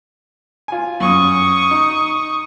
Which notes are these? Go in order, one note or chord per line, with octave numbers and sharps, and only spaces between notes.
F4 G#5
F#2 C#6 D#6
D#4